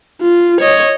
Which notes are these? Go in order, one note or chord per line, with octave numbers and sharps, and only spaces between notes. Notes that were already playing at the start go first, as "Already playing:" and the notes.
F4
C#5 D#5